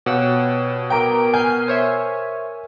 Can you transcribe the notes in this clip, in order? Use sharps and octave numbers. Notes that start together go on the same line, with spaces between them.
B2 G4 C#5 F5 F#5 E6
A#4 F5 G5 A#5 D6 D7
G#5 F6 G6 C7
C5 C#5 E5